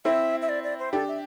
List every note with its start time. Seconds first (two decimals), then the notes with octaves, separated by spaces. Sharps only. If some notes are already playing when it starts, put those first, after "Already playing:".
0.05 C4 E4 E5
0.42 E5
0.49 D5
0.64 D5
0.79 C5
0.93 D4 G4 A4
1.08 E5